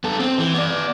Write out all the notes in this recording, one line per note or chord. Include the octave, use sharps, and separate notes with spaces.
B3 A4
C4
E3
B3 D5